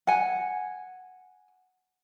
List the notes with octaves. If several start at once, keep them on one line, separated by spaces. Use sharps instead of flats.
F#5 G#5